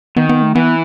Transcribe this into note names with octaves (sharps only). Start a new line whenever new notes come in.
D#3 B3
B3
A3
E3 B3